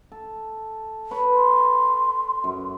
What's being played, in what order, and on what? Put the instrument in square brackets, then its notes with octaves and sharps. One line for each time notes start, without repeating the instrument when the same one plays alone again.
[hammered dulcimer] A4
B4 C#5
[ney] C6
[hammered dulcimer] F#2